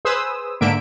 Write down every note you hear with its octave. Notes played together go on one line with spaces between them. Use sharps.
G#4 B4 C5 D#6 E6
G#2 D3 A#3 E5 D7